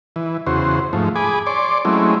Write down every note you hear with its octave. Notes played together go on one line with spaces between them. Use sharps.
E3
E2 C#3 F#4 C5
G#2 F3 A3
G#4 G#5 B5 D6
C#5 D5 C6 D6
F#3 G#3 A3 C4 C#4 E4